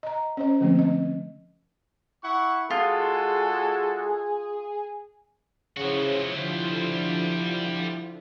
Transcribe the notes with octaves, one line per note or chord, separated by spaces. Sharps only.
D#5 A#5
C#4 C5 D#5
D3 F3 A3 A#3 C4
D#5
E4 F#5 C#6
G#3 F4 F#4 G#4 A4
C#3 F3 E4 F#4 C5 C#5
D3 F3 G3 E4 F4 C5